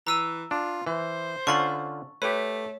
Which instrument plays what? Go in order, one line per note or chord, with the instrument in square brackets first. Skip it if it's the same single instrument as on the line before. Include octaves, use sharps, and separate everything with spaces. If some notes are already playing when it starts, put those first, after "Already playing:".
[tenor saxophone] E3 [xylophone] A#5 E6 D#7
[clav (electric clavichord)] D4 [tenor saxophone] F4
[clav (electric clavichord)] E3 [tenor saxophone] C5
[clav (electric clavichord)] D3 C#4 F4 [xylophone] C#6 A6 F#7
[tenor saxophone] A3 [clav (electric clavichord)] G4 B4 [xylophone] C#5